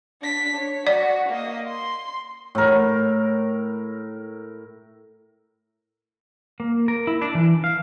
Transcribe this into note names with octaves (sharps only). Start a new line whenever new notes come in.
D4 B6
C#5
F#4 D5
A#3 D#5
C6
A2 A#4
A#3
A#4
E4
D4
E3
F5